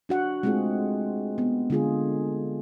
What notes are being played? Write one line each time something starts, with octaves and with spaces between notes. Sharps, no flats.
D4 F#4 F#5
G#3 A3 C4 F4 G#4
B3
D3 G#3 F4 G#4